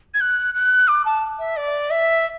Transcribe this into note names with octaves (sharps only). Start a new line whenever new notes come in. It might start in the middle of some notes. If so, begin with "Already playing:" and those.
G#6
F#6
F#6
D6
A5
E5
D5
E5